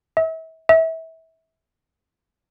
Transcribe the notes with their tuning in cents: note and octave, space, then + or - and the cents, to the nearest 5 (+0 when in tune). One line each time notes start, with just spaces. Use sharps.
E5 -35
E5 -25